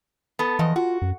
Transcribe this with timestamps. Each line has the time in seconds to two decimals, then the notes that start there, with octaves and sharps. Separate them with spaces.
0.39 B3 A4
0.59 E2 E3 F3 D#5
0.76 F4 F#4
1.02 F#2